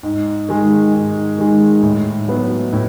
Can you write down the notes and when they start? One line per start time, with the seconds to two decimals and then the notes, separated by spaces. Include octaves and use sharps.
0.03 G#2
0.49 D#3 G#3
0.93 G#2
1.38 D#3 G#3
1.82 A2
2.28 F#3 B3
2.73 A2